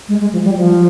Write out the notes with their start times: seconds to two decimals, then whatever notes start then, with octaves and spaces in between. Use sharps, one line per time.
0.09 G#3
0.21 G#3
0.33 F3
0.45 G3
0.57 F3